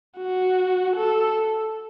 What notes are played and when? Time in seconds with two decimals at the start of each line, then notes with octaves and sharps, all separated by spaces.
0.18 F#4
0.96 A4